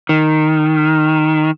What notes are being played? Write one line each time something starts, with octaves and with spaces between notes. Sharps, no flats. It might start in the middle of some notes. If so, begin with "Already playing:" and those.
D#3